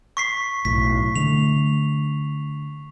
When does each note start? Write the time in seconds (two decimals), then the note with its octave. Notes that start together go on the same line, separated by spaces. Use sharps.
0.17 C#6 B6 C7
0.65 B1 A2 B6
1.16 D3 A3 F7